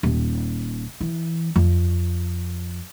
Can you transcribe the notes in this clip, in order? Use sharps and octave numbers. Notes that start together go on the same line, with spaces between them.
D#1
E3
F2